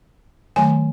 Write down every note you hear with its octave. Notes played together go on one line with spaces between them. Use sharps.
D#3 F#3 A3 G#5